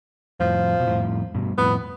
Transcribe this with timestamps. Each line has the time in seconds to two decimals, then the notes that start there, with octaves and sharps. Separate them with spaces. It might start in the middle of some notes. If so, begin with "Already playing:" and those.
0.40 F2 A2 F3
0.80 B2
0.87 F2 A2
1.35 G2 B2
1.58 F2 A2 B3